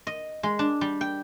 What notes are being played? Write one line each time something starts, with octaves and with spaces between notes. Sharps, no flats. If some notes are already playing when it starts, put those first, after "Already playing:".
D#5
G#3
D4
G3
G5